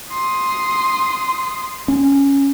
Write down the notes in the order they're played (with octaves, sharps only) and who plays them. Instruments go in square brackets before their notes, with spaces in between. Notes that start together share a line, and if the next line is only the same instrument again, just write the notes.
[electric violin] C6 D#6
[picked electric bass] C#4